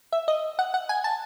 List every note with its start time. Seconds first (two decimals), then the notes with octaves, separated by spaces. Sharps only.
0.13 E5
0.28 D#5
0.59 F#5
0.74 F#5
0.89 G#5
1.04 A5